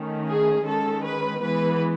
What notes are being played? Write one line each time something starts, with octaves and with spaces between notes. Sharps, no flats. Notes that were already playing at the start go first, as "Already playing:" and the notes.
Already playing: D#3 A3 C#4
G#4
D#3 G#3 C#4 A4
B4
E3 G#3 B3 B4